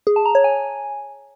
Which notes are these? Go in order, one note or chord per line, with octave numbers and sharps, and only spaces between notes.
G#4
A5
A#5
C#5
G#5